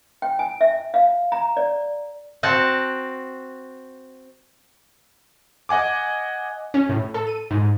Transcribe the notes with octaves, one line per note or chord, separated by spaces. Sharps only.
G5
G#5
E5
F5
A#5
D5
C4 F#4 A5
D#5 F#5 G#5 D6
C#4
A2
A4
D#7
G#2